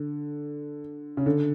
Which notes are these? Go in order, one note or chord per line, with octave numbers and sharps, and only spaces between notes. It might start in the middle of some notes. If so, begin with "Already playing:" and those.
Already playing: D3
C#3
D3